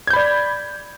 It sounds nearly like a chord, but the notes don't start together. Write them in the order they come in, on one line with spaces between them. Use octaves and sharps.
G#6 G6 B5 D5